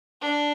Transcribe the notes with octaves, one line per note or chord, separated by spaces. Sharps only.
D4